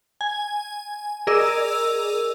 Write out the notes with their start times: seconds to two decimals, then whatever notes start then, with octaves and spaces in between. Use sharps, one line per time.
0.21 G#5
1.27 G#4 A#4 D5 D#5 E6